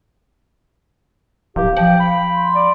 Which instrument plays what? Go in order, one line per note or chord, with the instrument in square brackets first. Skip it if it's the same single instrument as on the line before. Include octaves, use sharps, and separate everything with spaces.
[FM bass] D1 [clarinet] G4 [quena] F5
[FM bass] F3 [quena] F5 [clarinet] G5
[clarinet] B5
[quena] C6
[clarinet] D5